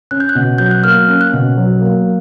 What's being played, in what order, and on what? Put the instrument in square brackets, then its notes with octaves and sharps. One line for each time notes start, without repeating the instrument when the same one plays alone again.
[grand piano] C#4 [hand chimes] F#6
[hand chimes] G6
F#6
[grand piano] B2
[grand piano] F#3 [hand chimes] G6
[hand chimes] F#6
[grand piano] A#3 [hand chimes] F6
[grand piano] C#4
[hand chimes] F#6
[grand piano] B2
F#3
A#3